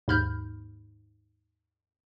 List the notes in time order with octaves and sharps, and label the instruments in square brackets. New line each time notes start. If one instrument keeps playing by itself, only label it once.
[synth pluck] D#2 G#2 B5 F6 G6